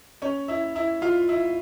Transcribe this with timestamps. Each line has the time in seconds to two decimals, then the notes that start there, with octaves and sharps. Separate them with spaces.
0.22 C#4 C#5
0.48 E4 E5
0.75 E4 E5
1.02 F4 F5
1.29 E4 E5